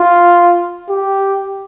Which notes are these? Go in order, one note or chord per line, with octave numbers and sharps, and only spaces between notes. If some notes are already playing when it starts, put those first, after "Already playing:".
Already playing: F4
G4